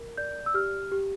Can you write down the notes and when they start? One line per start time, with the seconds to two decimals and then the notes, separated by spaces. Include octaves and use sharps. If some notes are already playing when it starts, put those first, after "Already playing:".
Already playing: A#4
0.17 D5 G6
0.46 E6
0.54 G4 F6
0.92 G4